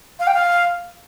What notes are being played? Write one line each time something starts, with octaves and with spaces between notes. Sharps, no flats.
F5
G5
F5